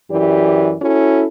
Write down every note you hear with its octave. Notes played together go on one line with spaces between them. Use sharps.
F#2 E3 G4 D5
C#4 E4 F#4 A4